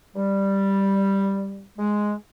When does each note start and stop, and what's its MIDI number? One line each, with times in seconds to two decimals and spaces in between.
0.16 1.65 55
1.78 2.14 56